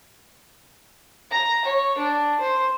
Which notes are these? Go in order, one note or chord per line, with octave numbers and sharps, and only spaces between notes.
A#5
C#5
D4
C5